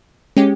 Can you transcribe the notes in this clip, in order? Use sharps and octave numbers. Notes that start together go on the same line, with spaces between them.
G#3 C#4 G4